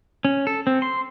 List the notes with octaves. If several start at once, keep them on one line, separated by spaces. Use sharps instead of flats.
C#4
A4
C4
C6